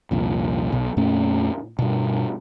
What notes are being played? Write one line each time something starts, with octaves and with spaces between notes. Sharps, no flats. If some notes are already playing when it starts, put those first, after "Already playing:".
C2 F2 A#2
B1 B2
F2 A#2 A3 C#4
G2 B2